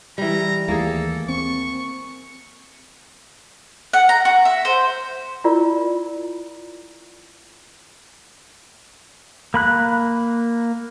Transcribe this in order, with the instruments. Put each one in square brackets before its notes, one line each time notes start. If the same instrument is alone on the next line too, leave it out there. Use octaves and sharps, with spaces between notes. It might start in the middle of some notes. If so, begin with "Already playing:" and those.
[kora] E3 G3 [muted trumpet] A#5
[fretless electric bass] D#2 E3 A3 [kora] A#3 G#4 [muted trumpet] A4
[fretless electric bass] C4 [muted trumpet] C#6
[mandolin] F#5
A#5
F#4
E5
C5
[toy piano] E4 F4 A#4 D5
[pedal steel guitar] A#3 B5 F#6